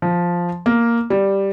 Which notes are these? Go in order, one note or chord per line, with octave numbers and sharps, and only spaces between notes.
F3
A#3
G3